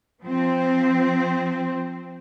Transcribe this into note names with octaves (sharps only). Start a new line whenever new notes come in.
F3 C4